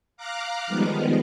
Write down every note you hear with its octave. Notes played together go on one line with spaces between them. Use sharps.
F5 A#5 D6 F6 F#6
D#3 F3 G3 G#3 B3